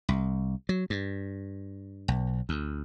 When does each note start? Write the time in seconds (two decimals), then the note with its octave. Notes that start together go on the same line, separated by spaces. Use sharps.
0.09 C2
0.69 F#3
0.90 G2
2.08 B1
2.49 D2